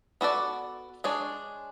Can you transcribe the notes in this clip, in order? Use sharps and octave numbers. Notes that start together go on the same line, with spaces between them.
B3 F#4 A4 D5
G#3 D4 G#4 C#5